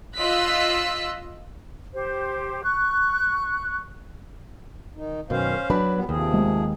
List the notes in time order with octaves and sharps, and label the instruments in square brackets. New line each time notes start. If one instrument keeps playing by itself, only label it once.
[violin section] F4 D#5 E6 F#6 B6
[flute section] G4 C5
C#6 F#6
[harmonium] D#3 D#4
[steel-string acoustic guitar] F#2 B2 D#3 [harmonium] C#4 C5 F5
[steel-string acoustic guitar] F#3 D4 B4 [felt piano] B5
[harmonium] A#2 G3 B3
[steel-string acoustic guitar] D#2 [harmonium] C3 F3 G#4
[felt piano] G#3